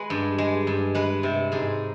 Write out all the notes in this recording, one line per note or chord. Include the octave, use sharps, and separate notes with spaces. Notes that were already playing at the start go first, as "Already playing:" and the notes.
Already playing: G#3 B4
G2
G#3
G2
G#3 B4
C3
G#2 G#4